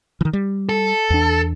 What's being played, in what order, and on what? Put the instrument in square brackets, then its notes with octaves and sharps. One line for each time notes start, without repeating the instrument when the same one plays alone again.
[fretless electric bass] D#3 E3
G3
[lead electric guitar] A4
[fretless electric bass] E2 D4